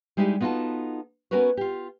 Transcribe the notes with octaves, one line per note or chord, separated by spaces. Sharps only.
G3 G#3 D#4 E4 G4
B3 D#4 F4 F#4 A4 A5
B3 C#4 F#4 A#4 B4 C#5
F4 G4